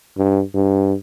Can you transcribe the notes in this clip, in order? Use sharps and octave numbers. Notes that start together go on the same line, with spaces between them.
G2
G2